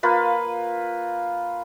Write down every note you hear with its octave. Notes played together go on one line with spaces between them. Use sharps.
A#3 F4 B4